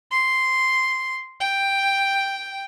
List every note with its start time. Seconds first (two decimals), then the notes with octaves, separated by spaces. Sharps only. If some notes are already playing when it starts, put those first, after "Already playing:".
0.11 C6
1.40 G5